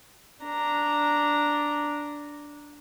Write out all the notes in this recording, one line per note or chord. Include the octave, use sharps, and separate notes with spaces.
D4 A#5